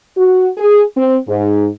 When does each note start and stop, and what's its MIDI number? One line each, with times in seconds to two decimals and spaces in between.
0.17 0.48 66
0.58 0.83 68
0.96 1.17 60
1.28 1.67 44